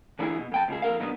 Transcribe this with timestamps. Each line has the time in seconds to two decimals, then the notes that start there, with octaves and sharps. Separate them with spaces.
0.19 D2 G2 E3 E4 G4 G#4
0.38 B2
0.52 F2 G5 A5
0.68 C#2 C#3 G#4
0.82 F2 E3 A#4 F5
1.00 B2 D#3 F#3 B3 D4